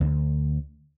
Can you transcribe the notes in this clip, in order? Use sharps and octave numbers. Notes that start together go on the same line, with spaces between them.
D2